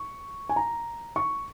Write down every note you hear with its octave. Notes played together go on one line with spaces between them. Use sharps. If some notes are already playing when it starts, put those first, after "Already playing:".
Already playing: C#6
G#5
A#5
C#6